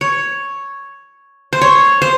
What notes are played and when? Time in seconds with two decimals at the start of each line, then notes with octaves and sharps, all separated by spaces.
0.01 C#5
1.53 C5
1.61 C#5
2.02 C5